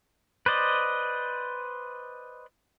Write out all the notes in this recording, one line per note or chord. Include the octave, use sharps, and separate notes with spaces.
B4 C5 D5 D#5